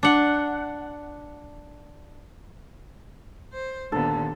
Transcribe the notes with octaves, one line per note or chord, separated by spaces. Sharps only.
D4 F#5
C5
D#2 A#2 D3 B3 A4